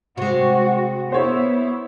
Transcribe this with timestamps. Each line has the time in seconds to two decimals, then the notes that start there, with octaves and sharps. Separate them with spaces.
0.18 C3 G#3 F#4
1.12 B3 E4 C5 C#5